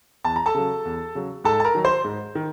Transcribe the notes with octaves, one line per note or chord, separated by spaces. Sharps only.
E2 A5
A#5
A4 A5
C#3 F#3
E2
C#3 F#3
G#2 A4 A5
A5
A#4 A#5
D#3 F#3
C5 C6
G#2
D#3